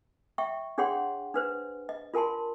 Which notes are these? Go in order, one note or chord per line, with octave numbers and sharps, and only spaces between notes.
E5 G5 C#6
D4 G#4 C#5 F#5 G5 C6
D4 B4 C5
D#5
F4 A#4 G#5 A5 C6